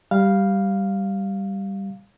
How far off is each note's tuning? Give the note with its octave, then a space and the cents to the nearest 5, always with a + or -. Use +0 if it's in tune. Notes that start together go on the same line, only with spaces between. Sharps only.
G3 +0 F5 +0